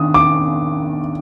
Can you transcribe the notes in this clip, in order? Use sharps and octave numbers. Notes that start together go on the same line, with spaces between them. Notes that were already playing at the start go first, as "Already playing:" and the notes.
Already playing: D#3 D4 D#6
D6